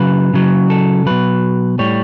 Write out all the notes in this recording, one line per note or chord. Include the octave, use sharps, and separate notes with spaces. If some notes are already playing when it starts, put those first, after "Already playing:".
Already playing: C#3 F#3 B4
C#3 F#3
A4
B2 F#3 B4
A2 G3 C#5